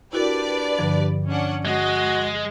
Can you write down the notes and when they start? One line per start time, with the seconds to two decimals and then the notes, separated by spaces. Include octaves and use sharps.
0.13 D4 E4 F#4 G4 A#4 B4 D5
0.78 G2 D3 F3
1.28 C#4 D4 F#5
1.65 G#3 F#4 D#5